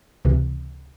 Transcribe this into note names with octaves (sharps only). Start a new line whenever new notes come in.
C#2 C3 E3